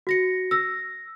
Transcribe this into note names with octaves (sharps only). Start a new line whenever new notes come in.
F#4 A#6 C#7
E6 A#6